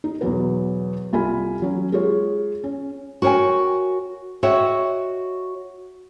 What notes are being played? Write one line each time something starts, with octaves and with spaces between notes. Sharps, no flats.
D#4
E2 B2 F#3 B3 F#4 B4
C2 F4 A4 G#5 B5
F#3 C#4
G#3 F4 G#4 C#5
C#4
F#4 A#4 C#5 G5 G#5
F#4 C#5 D#5 E5 F#5 G5